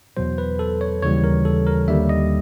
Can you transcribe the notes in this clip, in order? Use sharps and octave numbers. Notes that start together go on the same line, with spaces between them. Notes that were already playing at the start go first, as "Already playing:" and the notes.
E2 B2 F#3 C5
B4
A4
C#5
D#2 C#3 E3 G3 C#5
A#4
A4
A#4
D#2 D3 G3 E5
D#5